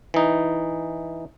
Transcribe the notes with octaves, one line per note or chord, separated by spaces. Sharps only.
E3 D#4